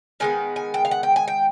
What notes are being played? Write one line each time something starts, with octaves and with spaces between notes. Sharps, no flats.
D#3 G#3 B3 G#5
G#5
G5
F5
F#5
G5
G#5
G5